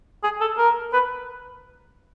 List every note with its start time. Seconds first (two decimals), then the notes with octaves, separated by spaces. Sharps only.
0.24 G#4
0.41 A4
0.58 A#4
0.93 B4